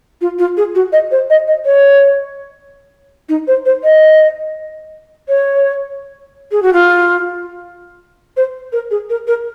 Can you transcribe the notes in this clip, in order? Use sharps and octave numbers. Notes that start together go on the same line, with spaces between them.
F4
F4
G#4
F#4
D#5
C5
D#5
D#5
C#5
D#4
C5
C5
D#5
C#5
G#4
F#4
F4
C5
A#4
G#4
A#4
A#4